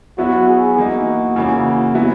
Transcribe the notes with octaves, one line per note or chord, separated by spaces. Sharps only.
F#3 B3 E4 F#4 B4 E5
G#4
E3 A#3 D#4 F#4
C#3 E3 A#3
F#3 B3 E4